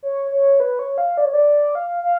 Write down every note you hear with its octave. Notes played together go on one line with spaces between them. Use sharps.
C#5
C#5
B4
C#5
F5
D5
C#5
D5
F5
F5